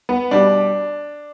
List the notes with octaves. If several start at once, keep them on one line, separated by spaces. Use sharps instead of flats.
B3
B2 G3 D4